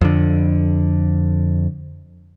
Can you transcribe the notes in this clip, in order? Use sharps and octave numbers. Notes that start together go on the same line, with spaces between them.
F2 D3